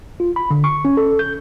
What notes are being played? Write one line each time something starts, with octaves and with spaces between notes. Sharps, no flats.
F4
B5
D3
C#6
C#4
A4
G6